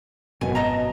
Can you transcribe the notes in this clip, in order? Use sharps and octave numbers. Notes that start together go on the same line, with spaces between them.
G#1 F#2 B2 G#5
D#5 A5 A#5